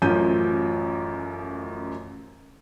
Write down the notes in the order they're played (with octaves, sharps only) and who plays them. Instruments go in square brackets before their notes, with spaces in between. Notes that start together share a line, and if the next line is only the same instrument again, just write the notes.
[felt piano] A1 F#2 F3 G6 D#7